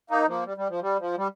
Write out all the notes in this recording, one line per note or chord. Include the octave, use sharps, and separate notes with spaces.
A#3 D#4
F3 A#3
G3
G3
F3
G3
F3
G3